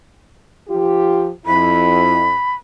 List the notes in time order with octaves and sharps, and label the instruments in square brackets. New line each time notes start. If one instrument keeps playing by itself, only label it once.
[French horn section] F3 F4 G4
[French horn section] F2 E4 [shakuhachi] B5